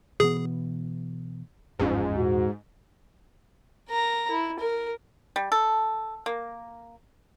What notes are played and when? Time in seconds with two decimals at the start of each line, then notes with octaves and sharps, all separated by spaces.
0.20 B2 E3 B3 G#4
1.79 G1 E2 G#2 F3 C#4
2.15 E2 A#2 F#4
3.89 A#4 A#5
4.31 E4
4.59 A#4
5.36 G3
5.52 A4
6.26 A#3